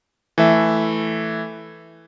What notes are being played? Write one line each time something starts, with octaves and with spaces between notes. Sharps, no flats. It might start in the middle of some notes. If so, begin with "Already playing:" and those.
E3 A3 E5